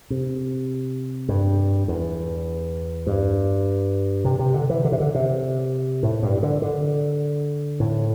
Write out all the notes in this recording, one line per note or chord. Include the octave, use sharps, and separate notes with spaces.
C3
G2
E2
G2
C3
C3
D3
E3
D3
C3
D3
C3
A2
G2
D3
D3
A2